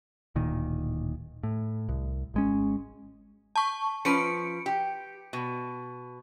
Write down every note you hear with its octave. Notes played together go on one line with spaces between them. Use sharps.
D1 A#2 D#3
A2
C2
G#1 G#3 C#4
A5 C#6
F3 C#4 B4 C#7 D7
G4
B2